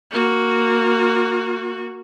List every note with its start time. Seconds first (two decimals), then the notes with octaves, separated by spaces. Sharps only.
0.11 A#3 F#4